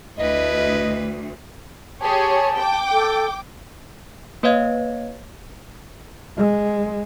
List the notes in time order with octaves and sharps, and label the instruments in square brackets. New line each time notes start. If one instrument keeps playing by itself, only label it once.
[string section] D2 [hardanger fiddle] E4 B4 [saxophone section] D#5
[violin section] G4 G#4 C#5 [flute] A5
[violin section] G5 D6
[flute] A4
[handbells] A#3 B4 C#5 D#5 F5 G#6
[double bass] G#3